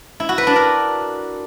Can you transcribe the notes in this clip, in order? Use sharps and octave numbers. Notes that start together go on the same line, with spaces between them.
E4
F#4
B4
D4
A#4